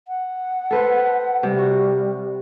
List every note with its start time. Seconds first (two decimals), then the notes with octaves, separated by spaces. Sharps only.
0.08 F#5
0.71 A4 B4 C5
1.43 C3 G3
1.58 F#4